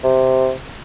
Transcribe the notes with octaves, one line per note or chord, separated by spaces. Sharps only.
C3